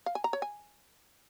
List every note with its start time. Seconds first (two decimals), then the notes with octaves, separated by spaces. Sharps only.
0.06 F5
0.15 G#5
0.24 A#5
0.33 C#5
0.42 G#5